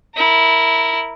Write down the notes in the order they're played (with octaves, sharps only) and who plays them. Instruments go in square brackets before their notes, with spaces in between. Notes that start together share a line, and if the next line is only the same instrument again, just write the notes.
[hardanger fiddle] E4 A#4